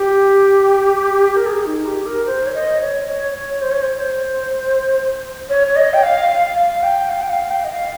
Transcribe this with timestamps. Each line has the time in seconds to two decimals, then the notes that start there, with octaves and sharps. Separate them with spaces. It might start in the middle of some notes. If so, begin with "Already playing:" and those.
Already playing: G4
1.35 A#4
1.46 G#4
1.66 D#4
1.86 G4
2.06 A#4
2.26 C5
2.47 C#5
2.54 D#5
2.81 C#5
3.08 C#5
3.34 C#5
3.61 C5
3.71 C#5
3.82 C5
5.49 C#5
5.67 C#5
5.76 D#5
5.93 G5
6.03 F5
6.30 F5
6.56 F5
6.83 G5
7.10 F5
7.21 G5
7.30 F5
7.50 G5
7.64 D#5
7.71 F5